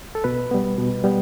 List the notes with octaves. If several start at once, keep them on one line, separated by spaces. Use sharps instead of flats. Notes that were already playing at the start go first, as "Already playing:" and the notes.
A4
B2 B4
G3 B3
B2
G3 B3